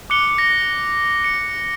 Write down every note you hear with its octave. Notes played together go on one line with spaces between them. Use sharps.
D6 F#6 C#7 G7
A#6
C#7